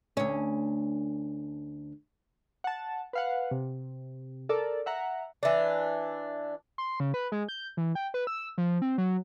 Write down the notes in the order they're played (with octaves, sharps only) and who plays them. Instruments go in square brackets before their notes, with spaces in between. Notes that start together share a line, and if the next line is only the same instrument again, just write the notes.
[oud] D2 C#4
[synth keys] F#5 A5
B4 F5 F#5
C3
A4 A#4 D5
E5 F#5 A#5
[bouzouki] E3 D4
[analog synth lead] C6
C#3
B4
G#3
G6
E3
G5
B4
E6
F3
C4
F#3